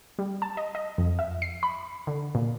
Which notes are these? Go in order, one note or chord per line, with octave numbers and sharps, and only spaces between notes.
G3
A5
D#5
D#5
F2
E5
C7
B5
D3
A#2